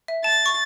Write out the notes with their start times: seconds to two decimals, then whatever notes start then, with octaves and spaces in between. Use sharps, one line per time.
0.08 E5
0.24 A5 A6
0.46 C#6